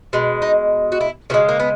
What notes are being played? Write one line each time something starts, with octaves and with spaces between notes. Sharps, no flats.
B2 G#3
D#4
F#4
E4
C#3 E3 G#3 F#4
A#3
B3